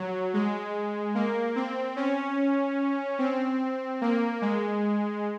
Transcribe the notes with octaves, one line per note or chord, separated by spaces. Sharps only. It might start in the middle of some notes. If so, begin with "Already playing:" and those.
Already playing: F#3
G#3
A#3
C4
C#4
C4
A#3
G#3